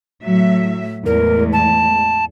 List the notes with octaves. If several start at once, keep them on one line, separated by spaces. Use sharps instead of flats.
A2 F#3 E5
E2 A2 G#3 A#4
A5